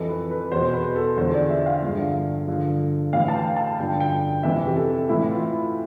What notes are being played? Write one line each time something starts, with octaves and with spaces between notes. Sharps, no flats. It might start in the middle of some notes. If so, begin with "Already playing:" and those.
Already playing: F2 E3 A4
B4
B4
E2 B2 C5
B4
A4
E2 D3 F3 C5
D5
E5
F5
G2 D3 F3
G2 D3 F3
A2 E3 F5
A5
G5
A5
G2 D3 F3 G5
G5
F2 C3 E3 E5
G4
A4
A2 E3 E4
F4